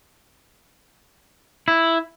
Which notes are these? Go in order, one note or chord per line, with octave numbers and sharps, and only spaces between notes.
E4